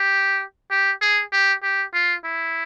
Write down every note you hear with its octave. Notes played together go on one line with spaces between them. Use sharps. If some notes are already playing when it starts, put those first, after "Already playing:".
Already playing: G4
G4
G#4
G4
G4
F4
E4